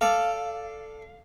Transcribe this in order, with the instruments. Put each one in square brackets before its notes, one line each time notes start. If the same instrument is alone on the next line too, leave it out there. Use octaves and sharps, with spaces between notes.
[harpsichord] A4 D5 [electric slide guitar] F5